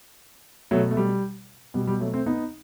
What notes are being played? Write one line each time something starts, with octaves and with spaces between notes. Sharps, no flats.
B2 F#3 A3
A3
G3
B2 G3
G3
F#3 A3
A3 C4
B3 D#4